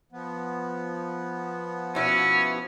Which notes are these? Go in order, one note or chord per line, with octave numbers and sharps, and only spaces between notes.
F3 B3
B2 C#4 E4